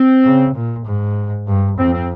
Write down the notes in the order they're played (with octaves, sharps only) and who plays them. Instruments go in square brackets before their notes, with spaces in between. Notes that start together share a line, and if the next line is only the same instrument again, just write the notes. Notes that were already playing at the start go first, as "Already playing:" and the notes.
Already playing: [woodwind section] C4
[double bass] C#3
A#2
G#2
G2
[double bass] F2 [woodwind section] C4
[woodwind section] C4